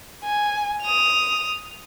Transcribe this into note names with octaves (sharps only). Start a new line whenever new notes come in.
G#5
D#6 F7